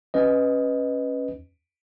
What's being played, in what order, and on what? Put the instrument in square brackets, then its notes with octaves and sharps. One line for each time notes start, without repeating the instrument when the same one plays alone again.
[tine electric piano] C#4 B4 D#5